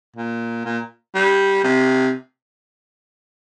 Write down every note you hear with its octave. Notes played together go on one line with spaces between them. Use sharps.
A#2
A#2
G3
C3